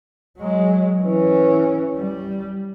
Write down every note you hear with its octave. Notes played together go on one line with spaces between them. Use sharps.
F#3 G#3
E3 C#4
G3